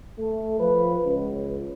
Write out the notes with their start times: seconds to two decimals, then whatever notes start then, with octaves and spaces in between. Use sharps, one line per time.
0.19 A3
0.59 F3 B4
1.03 C#2